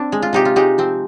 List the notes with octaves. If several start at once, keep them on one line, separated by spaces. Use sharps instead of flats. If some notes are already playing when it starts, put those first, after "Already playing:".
Already playing: C4 D4
G#3
F4
C3 D#4 G4
F4
G#3 D#4 G4
F3 C4